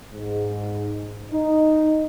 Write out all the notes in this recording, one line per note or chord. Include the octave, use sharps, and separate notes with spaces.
G#2
D#4